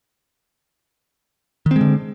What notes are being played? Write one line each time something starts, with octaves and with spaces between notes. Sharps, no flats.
D3 D#3 G#3 C4